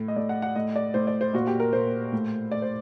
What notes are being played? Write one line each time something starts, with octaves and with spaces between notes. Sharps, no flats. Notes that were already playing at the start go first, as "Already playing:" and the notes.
Already playing: A2
D#5
A2 D5
F#5
F#5
A2 D#5
D5
A2 C5
D5
C5
A#2 F#4
G4
A#4
A#2 C5
A2
A2 D5
C5